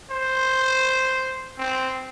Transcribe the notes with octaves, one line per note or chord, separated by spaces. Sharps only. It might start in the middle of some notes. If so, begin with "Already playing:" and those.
C5
C4